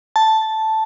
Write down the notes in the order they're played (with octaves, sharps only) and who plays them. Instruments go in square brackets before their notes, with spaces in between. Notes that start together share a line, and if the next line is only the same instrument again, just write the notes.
[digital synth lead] A5